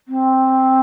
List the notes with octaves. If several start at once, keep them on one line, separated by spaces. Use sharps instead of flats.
C4